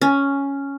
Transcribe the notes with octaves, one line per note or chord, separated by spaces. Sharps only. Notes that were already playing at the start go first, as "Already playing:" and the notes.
C#4